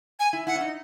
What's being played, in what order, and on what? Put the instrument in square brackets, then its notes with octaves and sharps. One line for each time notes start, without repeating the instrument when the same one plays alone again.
[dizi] G#5
[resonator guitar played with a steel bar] E4
[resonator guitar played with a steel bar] E4 [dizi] F#5
[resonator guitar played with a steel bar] C#4
D#4